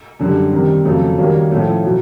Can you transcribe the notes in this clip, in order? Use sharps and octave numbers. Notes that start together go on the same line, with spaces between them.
F#2 D3 G3
C3 D#3 G3
F2 C#3 F#3 A3
D#3 G3 A#3 C#4 F#4
A2 F3 A3 C#4
B2 F#3